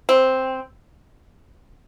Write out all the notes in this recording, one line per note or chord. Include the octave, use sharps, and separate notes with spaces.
C4